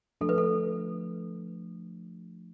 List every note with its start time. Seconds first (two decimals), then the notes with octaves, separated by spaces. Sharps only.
0.21 F3 A3 D4 A4
0.29 B4
0.38 A4